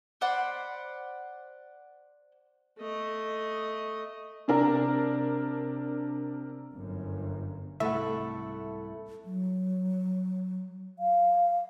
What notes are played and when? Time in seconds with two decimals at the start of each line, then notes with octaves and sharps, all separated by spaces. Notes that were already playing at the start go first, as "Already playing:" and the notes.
0.21 C5 D5 F#5 B5
2.79 A3 D#5
4.48 C3 D4 A#4
6.76 G1 F#2
7.80 C2 G#2 C3 A3 E4 A4 E5 F#5
9.24 F#3
10.99 F5